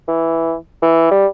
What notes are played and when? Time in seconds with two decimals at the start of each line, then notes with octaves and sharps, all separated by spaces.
0.08 E3
0.82 E3
1.11 G3